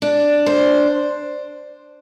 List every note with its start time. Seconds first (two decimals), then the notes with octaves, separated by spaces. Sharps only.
0.02 D4
0.46 C5